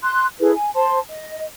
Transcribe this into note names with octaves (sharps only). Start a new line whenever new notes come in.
C6 F#6
E4 G#4 A4 B4
G#5
C5 A5 C6
D#5